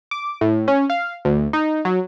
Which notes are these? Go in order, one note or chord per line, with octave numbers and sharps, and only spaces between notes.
D6
A2
C#4
F5
D2
D#4
F#3